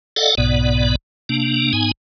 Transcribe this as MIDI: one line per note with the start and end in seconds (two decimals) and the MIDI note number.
0.16 0.35 69
0.16 0.35 74
0.16 0.35 75
0.16 0.35 77
0.16 0.35 78
0.38 0.95 35
0.38 0.95 44
0.38 0.95 47
0.38 0.95 59
0.38 0.95 74
1.29 1.73 48
1.29 1.73 58
1.29 1.73 62
1.73 1.92 44
1.73 1.92 59
1.73 1.92 63
1.73 1.92 80